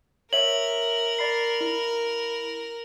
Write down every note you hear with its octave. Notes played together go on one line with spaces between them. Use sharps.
A#4 C#5 E5 F#7
D5 B5 C7
E4